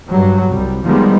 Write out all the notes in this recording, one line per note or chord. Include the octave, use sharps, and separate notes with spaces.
G2 F#3 G3
C2 G3
D#3 F3 G3 G#3 B3